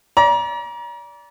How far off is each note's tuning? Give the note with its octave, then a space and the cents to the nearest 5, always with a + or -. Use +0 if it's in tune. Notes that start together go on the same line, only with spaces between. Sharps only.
D5 -25 A#5 +35